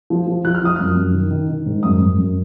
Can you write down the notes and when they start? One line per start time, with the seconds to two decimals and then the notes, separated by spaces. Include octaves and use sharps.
0.10 F3
0.27 F3
0.45 F3 F#6
0.55 F6
0.61 F3 D#6
0.76 F#2 F6
0.96 F#2
1.14 D#3
1.31 D#3
1.49 D#3
1.66 G#2
1.83 F#2 D#6
2.00 F#2
2.18 F#2